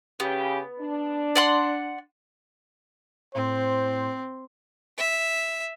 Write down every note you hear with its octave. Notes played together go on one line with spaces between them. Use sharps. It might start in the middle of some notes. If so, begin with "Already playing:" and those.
C#3 B3 G4
D4
D5 F#5 C6
A2 C4 C5
E5